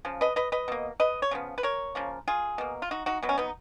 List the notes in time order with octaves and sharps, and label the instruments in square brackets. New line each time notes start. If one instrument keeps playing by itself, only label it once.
[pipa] C#3 F3
B4 D#5
B4 D#5
B4 D#5
B2 A#3
B4 D#5
C#5
C#3 F3 B3
B4
A#4 C#5
C#3 F3 A#3
F4 G#4
B2 A#3
F4
D#4 F#4
D#4 F#4
B2 F#3 B3
C#4
B3 D#4